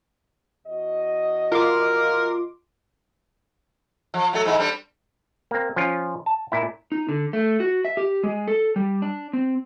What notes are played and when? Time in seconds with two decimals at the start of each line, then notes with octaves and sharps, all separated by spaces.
0.67 E2 F#4 D#5
1.52 F4 A#4 C6 D6
4.14 F3
4.33 F#3 A3 A4
4.45 G#2 G#3 E4
4.59 G3 C4 D4
5.51 A#3 C4
5.76 F3 C#4 F4
6.26 A5
6.52 A#2 E4
6.92 D#4
7.09 D3
7.33 A3
7.60 F#4
7.85 E5
7.97 G4
8.24 G#3
8.48 A4
8.76 G3
9.02 D4
9.33 C4